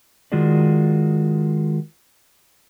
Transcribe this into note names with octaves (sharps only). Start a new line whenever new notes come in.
D#3 G#3 F4 F#4 G#4 D5